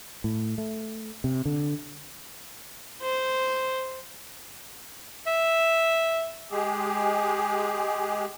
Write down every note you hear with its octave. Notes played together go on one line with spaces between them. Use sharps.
A2
A3
C3
D3
C5
E5
G#3 G4 G#4